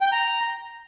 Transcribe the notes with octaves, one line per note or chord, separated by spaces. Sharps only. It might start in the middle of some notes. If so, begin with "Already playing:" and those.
G5
G6
A#5